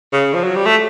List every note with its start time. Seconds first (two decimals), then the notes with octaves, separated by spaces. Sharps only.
0.12 C#3
0.34 F3
0.44 F#3
0.55 G3
0.66 A3